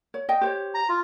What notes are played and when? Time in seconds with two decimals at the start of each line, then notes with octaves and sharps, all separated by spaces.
0.14 C#5
0.29 D#5 G5
0.41 G4 C5 C#5
0.74 A#5
0.89 F4